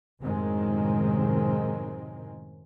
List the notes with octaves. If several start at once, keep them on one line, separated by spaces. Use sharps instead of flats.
F#2 A2 C3 D#3 G#3 C4